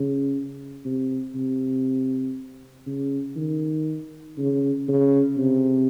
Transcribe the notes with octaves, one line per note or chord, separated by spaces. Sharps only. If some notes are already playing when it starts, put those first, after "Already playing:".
Already playing: C#3
C3
C3
C#3
D#3
C#3
C#3
C3